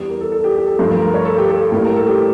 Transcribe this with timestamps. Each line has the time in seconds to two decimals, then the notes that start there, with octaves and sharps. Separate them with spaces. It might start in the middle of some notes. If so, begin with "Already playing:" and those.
Already playing: E2 E3 G3
0.09 A#4
0.21 A4
0.32 A4
0.44 G4
0.56 G4
0.67 A4
0.79 G2 F3 A3 A4
0.90 A#4
1.02 A#4
1.14 C#5
1.25 A4
1.38 G4
1.50 A4
1.72 A2 G3 A#3 A4
1.84 A#4
1.96 A4
2.07 G4